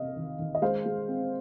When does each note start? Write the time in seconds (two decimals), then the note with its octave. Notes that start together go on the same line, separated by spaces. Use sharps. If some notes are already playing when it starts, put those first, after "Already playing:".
Already playing: C3 D#5 F5
0.16 D#3
0.39 D#3
0.55 D#5
0.62 G#3 C5 F5
0.86 G#3
1.08 C4